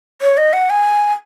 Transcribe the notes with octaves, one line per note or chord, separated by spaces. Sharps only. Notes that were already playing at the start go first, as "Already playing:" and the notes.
C#5
D#5
F#5
G#5